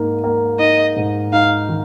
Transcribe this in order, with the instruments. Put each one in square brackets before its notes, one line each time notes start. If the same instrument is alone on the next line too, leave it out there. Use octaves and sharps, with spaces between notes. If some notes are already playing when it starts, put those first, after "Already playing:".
Already playing: [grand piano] G#2 A#3 D#4
A#3
[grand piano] D#4 [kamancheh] D#5
[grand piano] G#2
[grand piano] D#4 [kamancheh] F5
[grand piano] D#3